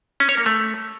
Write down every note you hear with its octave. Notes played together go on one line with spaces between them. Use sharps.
C#4
C#5
A#3
A3